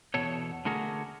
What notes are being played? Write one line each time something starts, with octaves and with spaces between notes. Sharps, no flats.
E2 B2 A4 C#5
D3 A3 F#4 G#4 A#4